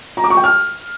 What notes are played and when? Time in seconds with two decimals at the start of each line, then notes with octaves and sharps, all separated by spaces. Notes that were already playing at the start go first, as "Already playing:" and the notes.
0.17 A#5
0.24 D6
0.30 C#6
0.37 G5
0.44 F6